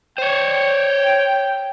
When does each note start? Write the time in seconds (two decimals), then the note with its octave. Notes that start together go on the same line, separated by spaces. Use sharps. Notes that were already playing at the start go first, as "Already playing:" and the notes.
0.18 C5 C#5 G5